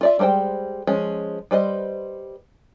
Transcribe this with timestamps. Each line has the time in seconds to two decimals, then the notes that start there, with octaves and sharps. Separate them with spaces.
0.01 F4 D5 E5
0.19 G3 G#3 A#4 C5 G5
0.87 F3 G#3 C#4
1.51 G3 B4 C5 D#5